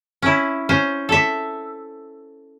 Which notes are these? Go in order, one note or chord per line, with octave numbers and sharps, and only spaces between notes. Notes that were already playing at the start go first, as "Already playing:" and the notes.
C#4 E4
C#4 C5
A4 E5